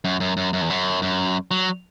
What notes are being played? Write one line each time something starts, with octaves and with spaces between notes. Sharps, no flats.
F#2
F#2
F#2
F#2
E2
F#2
F#2
F#3